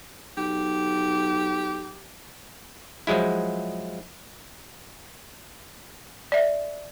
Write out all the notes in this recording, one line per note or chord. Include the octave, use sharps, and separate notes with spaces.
B1 G4
F3 F#3 G#3 E4
D5 E5